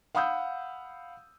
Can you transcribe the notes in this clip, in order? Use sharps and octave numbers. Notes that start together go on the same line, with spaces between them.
F5 F#5 B5 D#6 E6 G6